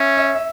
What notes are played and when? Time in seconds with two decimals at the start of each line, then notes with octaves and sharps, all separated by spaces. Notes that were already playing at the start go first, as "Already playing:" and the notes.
Already playing: C#4 E5
0.17 E5
0.35 E5